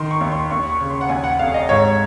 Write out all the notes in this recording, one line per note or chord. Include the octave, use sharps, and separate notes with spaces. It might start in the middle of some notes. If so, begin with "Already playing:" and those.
Already playing: D#3 C6
C#6
D#2
C6
D#2 C#6
C#6
C#3
C6
F#5
D#2 G#5
F#5
F1 F5
D#5
G#2 C#5